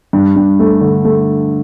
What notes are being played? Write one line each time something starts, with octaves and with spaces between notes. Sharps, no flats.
G2
G2
A3
D3
A3